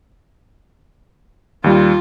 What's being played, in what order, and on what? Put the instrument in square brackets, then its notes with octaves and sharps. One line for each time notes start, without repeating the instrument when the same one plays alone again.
[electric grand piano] D#2 G3 [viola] F4